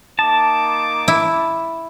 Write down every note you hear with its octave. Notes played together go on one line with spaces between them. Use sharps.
A#3 D#4 A5 D6
E4